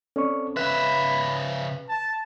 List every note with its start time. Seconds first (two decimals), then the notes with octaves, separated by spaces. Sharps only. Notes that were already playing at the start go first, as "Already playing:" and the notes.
0.16 C4 C#4 A4 D5 C#6
0.57 C#3 B4 E5 B5 F#6
1.89 A5